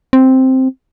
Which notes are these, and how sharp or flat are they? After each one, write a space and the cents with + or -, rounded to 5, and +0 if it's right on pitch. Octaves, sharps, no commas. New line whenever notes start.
C4 +0